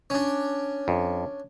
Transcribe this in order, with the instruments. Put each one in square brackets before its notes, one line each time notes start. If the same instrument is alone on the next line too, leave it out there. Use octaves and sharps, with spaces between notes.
[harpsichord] C#4 D4
[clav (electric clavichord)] F2